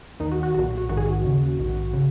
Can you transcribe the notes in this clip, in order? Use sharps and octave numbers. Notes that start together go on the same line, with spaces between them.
D#2 D#3 D#4
F#4
F#4
B1 A#2 F#4
F#4
A#1 G#2 D#3 F#4
G#4
F#4
D#2 C#3
A#1 G#2 D#3
C#3